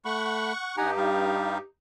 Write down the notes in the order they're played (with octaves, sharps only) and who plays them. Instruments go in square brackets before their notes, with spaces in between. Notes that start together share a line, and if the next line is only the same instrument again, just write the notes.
[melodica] A3 B5 [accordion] F#5 C#6
[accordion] G2 D#4 [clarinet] G4 [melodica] F#5 G#5 A#5
[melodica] G3 F5